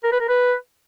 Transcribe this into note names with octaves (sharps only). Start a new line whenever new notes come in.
A#4
B4
A#4
B4